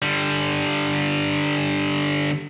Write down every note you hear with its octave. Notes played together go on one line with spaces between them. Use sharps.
D3 G3